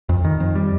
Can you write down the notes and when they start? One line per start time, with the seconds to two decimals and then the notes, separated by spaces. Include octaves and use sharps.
0.09 F2
0.25 D#3
0.40 F2
0.55 G3